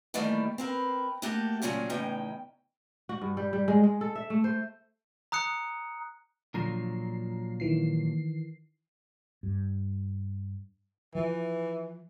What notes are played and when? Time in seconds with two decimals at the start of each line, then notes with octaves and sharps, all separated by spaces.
0.14 D#3 E3 G3 A3 A#3
0.58 C4 A#4 B4
1.22 A3 A#3 F#4 G4 A4
1.62 A#2 C#3 F#3 C#4 G#4
1.90 E2 A2 C#3 D#4 G5
3.09 F#4
3.21 G2
3.37 G3
3.53 G3
3.68 G#3
3.83 G#3
4.01 A4
4.15 E5
4.30 A3
4.44 C5
5.32 A#5 D#6 F#6 C#7
6.54 A#2 D3 F3 F#3 A#5 C7
7.60 D#3 E3 C7
9.43 G2
11.15 E3 F3